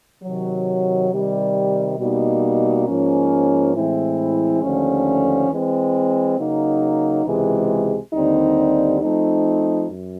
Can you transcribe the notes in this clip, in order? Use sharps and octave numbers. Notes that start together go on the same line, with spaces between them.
C3 D#3 F#3
C3 D#3 G3
B2 G3 A#3 D#4
G#2 F3 A#3 C#4
A2 E3 G#3 C4 E4
D#2 D3 F3 A3 C#4
E3 G#3 C4
C#3 F#3 A#3 D#4
C#2 C3 E3 G#3
D#2 D3 G3 C4 D#4
F3 A3 C4 D#4
F#2